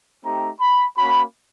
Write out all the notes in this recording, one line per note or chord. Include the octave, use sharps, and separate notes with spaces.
A3 C4 D#4 G4 A#5
B5
A#3 C#4 F#4 B5